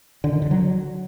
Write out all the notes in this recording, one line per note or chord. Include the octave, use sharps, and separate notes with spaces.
D3
D#3
D3
F#3